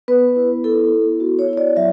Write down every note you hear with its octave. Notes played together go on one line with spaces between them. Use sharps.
B3 B4
E4
E4 A4
B3
B3 F#4
C#5
E4
C#5
D5
F#3 E5